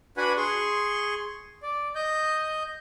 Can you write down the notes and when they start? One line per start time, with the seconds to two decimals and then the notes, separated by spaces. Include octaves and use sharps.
0.17 D4 F#4 B4 F#5 G#5 B5
0.37 G#4 C6 C#6
1.63 D5
1.95 D#5 G6